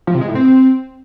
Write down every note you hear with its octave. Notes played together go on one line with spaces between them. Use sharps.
F3
C3
G#3
A2
C4